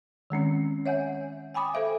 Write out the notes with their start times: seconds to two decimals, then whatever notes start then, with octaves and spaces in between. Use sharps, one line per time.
0.30 D#3 G#3 C4 C#4
0.86 C#5 E5 F#5 G#5 G6
1.54 G5 G#5 B5 D6 D#6
1.74 A4 C5 E5 F5